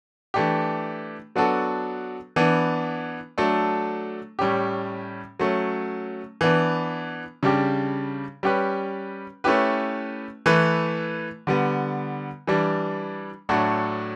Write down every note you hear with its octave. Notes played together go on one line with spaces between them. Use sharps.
E3 A3 D4 G4
F#3 B3 D4 F#4 A4
E3 B3 D4
F#3 A3 D4 A4
A2 G3 C#4 G4
F#3 A3 C#4
E3 B3 D4
C#3 G3 D4 G4
G3 C#4 G4 B4
A3 C#4 E4 G4 B4
E3 A3 E4 B4
D3 G3 B3
E3 G3 D4
A2 F#3 A3 D4 F#4